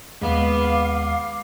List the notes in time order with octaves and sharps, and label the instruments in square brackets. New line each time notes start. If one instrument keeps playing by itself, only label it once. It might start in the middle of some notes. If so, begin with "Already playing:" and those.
[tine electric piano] D#2 G#3 [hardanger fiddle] B3 [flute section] F5 D6